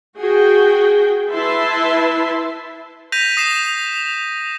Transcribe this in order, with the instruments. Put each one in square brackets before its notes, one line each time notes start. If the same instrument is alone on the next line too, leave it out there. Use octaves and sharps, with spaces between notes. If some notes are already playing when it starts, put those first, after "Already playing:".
[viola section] F#4 G#4 G5
E4 B4 E5 A5 C6
[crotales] G6 A#6 B6 D#7 F7
D#6 A#6 C7 E7